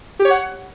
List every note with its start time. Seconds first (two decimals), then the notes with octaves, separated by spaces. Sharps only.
0.19 G4
0.25 C#5
0.30 F#5